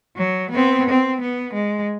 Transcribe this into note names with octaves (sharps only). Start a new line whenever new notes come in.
F#3
B3 C4
C4
B3
G#3